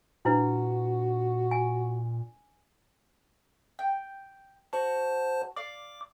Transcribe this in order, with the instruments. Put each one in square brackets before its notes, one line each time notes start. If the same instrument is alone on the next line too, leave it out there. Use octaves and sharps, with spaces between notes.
[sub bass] A#2 [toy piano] D4 E4 B4 [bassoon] F#4
[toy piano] G#5
[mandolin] G5
[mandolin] F#4 [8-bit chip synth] C5 A5
[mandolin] D5 F5 [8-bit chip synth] D6